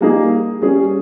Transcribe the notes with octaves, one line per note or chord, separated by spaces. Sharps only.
G3 A#3 D#4 G#4
G3 C#4 G#4